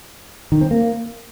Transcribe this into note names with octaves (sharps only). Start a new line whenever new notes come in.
D#3
C4
A#3